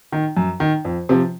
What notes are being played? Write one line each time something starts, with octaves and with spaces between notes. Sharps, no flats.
D#3
F#2
D#3
F2
C3 F3